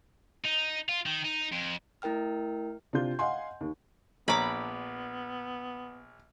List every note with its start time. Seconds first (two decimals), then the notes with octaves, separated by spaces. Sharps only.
0.44 D#4
0.89 F4
1.06 D#3
1.24 D#4
1.53 F2
2.02 A3 E4 A#4 G5 F6
2.93 C3 D4 F4 G6
3.19 D#5 F5 F#5 G#5 C6
3.61 D#2
4.28 A#1 D3 B3 C#5 A#5 B5 D6